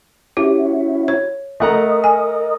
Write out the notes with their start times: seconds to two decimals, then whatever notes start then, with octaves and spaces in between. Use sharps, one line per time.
0.37 C#4 E4 F#4 G4
1.08 C#5
1.60 A3 A#4 D#5 F#5 A#5
2.04 G#5